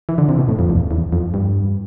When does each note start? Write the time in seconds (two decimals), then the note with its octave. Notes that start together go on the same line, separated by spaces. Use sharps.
0.09 E3
0.18 D3
0.29 C3
0.39 B2
0.49 A2
0.59 F2
0.70 E2
0.91 E2
1.13 F2
1.34 G2